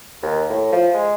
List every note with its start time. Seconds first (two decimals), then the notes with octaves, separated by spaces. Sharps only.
0.23 D#2
0.49 A2
0.72 F3
0.94 G#3